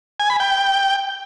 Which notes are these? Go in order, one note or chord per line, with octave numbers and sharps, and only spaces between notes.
G#5
B5
G5